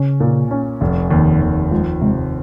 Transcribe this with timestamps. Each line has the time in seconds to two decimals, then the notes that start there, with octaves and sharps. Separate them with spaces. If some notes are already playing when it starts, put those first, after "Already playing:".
Already playing: C#3 C#4
0.20 A#2
0.51 C#4
0.81 F1
1.11 D#2
1.42 D#2
1.71 F3 G#3
2.01 C3 G#3